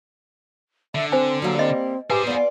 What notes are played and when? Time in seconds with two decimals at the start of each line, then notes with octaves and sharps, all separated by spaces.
0.95 D3 E5
1.12 C4 C5 G#5
1.42 F#3 G3 A#3
1.59 C4 D#5
2.10 G4 G#4 B4 C5 G#5
2.27 B3 F4 D5